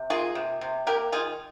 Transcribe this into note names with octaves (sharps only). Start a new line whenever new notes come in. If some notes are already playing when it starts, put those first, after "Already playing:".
Already playing: C3
A#3 F4 G#4
C3
C3
A#3 G4 A#4
D#3 F4 G#4